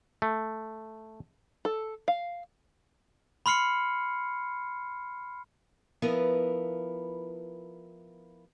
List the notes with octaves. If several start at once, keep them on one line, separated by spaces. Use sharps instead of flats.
A3
A4
F5
B5 C6 F6 C7 C#7
F3 B3 E4 A#4 B4